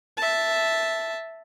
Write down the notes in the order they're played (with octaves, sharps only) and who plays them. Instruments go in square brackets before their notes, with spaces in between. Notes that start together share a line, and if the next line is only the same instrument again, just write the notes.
[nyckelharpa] E5 A5